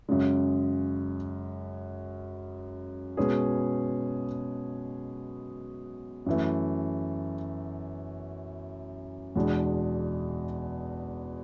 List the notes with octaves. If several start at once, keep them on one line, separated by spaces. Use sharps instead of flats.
F#2 C#3 G#3
B2 G#3 C#4 G#4 B4
F#2 E3 A3
E2 B2 G#3 D4